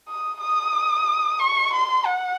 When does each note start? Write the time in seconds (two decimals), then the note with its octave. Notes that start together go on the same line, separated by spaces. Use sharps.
0.08 D#6
0.41 D#6
1.40 C#6
1.73 C6
2.06 F#5